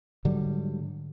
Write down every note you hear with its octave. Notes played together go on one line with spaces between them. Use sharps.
G#2 D3 F#3 G3